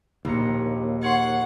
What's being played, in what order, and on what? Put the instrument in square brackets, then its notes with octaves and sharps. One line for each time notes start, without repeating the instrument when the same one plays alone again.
[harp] A#1 A#5 C#7 [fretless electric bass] D#2
[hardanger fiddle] F#5 [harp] C6 C#6 G#6